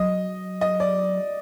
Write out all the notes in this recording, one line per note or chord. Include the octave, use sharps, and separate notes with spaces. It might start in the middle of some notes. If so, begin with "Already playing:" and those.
Already playing: F#3 D#5
D#5
D5